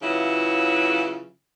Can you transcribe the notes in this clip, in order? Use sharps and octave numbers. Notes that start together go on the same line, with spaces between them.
C#3 E3 F#3 E4 F4